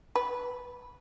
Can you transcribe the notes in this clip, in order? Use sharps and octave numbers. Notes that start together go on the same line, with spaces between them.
B4